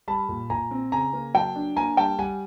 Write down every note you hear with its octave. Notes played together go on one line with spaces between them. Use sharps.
G3 A5 B5
A#2
A#2 G#5 A#5
C4
C#3 G#5 A#5
A#3
F#3 G5 A5
D4
A#3 G#5 A#5
G3 G5 A5
G3 F#5 G#5